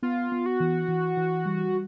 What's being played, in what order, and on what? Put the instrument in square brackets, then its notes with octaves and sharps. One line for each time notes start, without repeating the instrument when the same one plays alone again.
[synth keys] B3 [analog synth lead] F4
[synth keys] B3
[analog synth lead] F#4
[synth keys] E3
E3
E3
G3